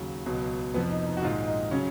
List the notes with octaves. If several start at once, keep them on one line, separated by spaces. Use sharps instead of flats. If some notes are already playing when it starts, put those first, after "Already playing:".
Already playing: D#2 C#3 F#3
C#2 B2 F#3
F1 F2 F3 B3
D#4
D#4
F#4
A#1 G#2 D#3 F4
D#4
C#3 F#3 C#4